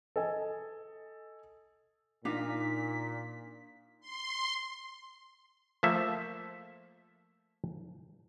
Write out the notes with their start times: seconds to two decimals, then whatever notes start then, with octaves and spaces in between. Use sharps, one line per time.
0.16 A4 D#5 G#5
2.25 A#2 D4 D#4 F4 B6
4.00 C6
5.83 F3 A3 A#3 A4 E5